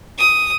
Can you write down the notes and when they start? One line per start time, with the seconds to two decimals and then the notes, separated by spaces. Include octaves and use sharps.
0.19 D#6